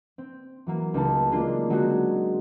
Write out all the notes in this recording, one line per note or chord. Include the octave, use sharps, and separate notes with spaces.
C4
E3 F#3 A#3
C#2 A3 D#4 A5
G#3 A#3 D4 F4
D3 F#3 G#3 C4 D#4 F#4